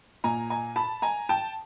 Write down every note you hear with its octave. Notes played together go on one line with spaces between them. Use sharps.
A#2 G#5 A#5
G#5 A#5
A5 B5
G#5 A#5
G5 A5